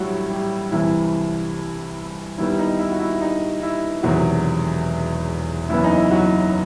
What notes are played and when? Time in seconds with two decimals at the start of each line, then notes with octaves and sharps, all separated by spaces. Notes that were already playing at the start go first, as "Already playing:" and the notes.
Already playing: A1 A2 F#3 G3 E4 F#4
0.30 G3 G4
0.71 C2 C3 E3 E4
2.37 D#2 D#3 G3 B3 E4
2.59 D#4
2.79 E4
2.92 F#4
2.99 E4
3.21 D#4
3.63 E4
4.03 E1 E2 C3 D#3 F#3 F#4
5.69 F#1 F#2 E3 B3 E4
5.84 D#4
5.97 E4
6.11 F#3 F#4